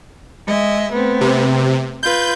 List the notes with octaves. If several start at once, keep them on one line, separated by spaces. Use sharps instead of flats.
G#3 D#5 E5
A3 B3 C4
C3
F4 B4 G6